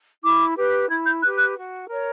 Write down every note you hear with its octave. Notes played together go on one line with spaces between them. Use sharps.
E4 D6
G4 B4
E4 G#6
G6
G4 B4 F#6
F#6
F#4
A#4 C#5